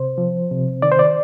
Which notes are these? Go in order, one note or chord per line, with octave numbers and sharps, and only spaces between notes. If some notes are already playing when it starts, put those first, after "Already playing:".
Already playing: C3 C5
F3
C3
D#3 D5
C5
D5